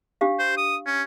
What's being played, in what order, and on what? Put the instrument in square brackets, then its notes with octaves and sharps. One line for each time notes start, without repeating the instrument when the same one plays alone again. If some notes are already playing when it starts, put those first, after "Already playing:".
[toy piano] D4 G4 F5
[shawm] C5
D#6
C#4